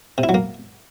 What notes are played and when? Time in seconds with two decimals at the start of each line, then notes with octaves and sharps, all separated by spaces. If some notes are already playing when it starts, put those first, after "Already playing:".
0.18 C3
0.23 E4
0.29 F#3
0.34 A#3